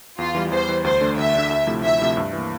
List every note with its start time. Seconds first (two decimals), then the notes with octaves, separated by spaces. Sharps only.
0.18 E2 F4
0.35 E3 G3
0.51 E2 C5
0.68 E3 G3
0.84 D2 C5
1.01 D3 A3 D4
1.18 D2 E5
1.34 D3 A3 D4
1.51 D2
1.67 C3 F3 A3 E4
1.83 D2 E5
2.00 C3 F3 A3 E4
2.17 G2
2.33 E3 A#3